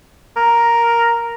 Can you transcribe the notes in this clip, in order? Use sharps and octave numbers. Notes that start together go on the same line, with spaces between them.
A#4